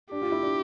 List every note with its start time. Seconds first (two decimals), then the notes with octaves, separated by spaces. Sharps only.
0.11 D4 G4
0.22 F4
0.32 E4
0.42 D4